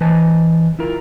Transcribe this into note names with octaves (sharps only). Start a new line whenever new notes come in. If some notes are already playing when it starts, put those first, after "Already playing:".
E3 B4 C5 D#5 G#5 A5
E4 F4 A#4